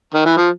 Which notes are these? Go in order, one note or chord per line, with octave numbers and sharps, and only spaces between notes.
D#3
E3
F3